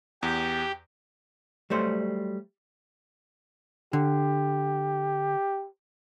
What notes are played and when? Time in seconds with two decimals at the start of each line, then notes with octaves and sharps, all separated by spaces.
0.23 E2 G4
1.70 F#3 G3 A3 C5
3.93 D3 G4